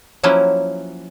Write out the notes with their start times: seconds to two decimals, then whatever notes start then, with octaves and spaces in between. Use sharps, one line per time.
0.23 F3 F#3 A#3 C#4 E4